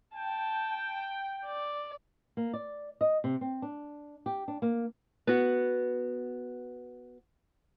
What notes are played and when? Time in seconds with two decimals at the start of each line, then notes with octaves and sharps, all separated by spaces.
0.15 G5 A5
1.45 D5
2.37 A#3
2.53 D5
3.01 D#5
3.24 C3
3.41 C4
3.62 D4
4.26 G4
4.48 D4
4.62 A#3
5.27 B3 F#4